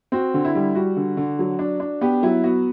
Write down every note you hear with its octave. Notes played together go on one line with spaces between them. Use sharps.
C4 F#4
D3
E4
G3
G3 F#4
D3
D3
F#3
D4
D4
B3 G4
F#3 E4
B3 F#4